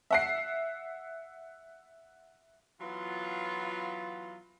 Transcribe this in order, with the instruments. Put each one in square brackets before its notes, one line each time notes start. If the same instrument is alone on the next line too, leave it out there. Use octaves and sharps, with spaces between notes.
[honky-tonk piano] E5 F#5 C7
[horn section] E3 F#3 B3 F4